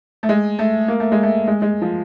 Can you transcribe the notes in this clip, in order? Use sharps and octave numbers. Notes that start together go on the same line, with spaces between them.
A3
G#3
A3
A#3
A3
G#3
A3
G#3
G#3
F3